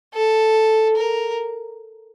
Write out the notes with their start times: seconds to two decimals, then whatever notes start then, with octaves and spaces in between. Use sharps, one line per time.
0.14 A4
0.96 A#4